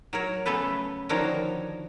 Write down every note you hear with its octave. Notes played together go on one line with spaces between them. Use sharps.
F#3 A#4 C#5
C#3 A3 B3 A4 B4
D3 D#3 F3 F#4 A#4 C#5